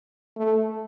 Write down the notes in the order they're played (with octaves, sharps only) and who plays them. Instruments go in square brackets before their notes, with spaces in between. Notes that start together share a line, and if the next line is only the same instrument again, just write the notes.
[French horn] A3